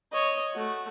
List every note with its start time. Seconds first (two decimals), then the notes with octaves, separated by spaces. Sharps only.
0.13 C#5 D#5
0.53 A3 F#4